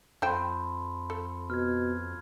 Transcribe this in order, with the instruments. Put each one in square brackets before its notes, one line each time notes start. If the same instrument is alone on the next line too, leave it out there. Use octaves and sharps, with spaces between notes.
[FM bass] F2 [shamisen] A4 C5 G5 [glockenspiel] A5 B5 C6
[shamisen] A4
[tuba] B2 [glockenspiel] F6 G#6